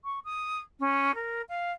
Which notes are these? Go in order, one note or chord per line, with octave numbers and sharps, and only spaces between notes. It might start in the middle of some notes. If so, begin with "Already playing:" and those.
C#6
D#6
C#4
A#4
F5